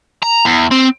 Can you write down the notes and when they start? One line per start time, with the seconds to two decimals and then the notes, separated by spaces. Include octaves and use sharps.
0.23 A#5
0.45 E2
0.71 C4